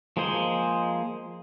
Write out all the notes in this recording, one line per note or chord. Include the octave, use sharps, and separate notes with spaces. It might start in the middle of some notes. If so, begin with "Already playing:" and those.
F3 G#3 A#3 G#4 C5